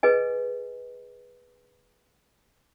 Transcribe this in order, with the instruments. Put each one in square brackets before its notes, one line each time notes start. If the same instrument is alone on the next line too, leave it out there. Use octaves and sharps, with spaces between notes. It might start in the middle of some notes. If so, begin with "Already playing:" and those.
[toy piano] G#4 B4 D#5 G#5